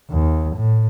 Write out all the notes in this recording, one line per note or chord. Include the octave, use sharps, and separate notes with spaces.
D#2
A2